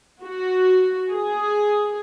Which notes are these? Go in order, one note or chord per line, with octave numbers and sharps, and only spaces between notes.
F#4
G#4